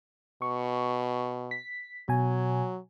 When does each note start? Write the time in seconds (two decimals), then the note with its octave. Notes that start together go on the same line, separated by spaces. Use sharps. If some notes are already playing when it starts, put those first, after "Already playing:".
0.42 B2 C#6
1.51 B6
2.09 B2 F#3 G#5